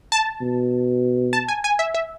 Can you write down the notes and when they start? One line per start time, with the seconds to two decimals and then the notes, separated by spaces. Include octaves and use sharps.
0.12 A5
0.41 B2
1.33 A5
1.48 G#5
1.64 G#5
1.79 E5
1.94 E5